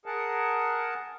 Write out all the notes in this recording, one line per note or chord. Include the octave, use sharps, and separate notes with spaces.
G#4 A#4 F#5 A5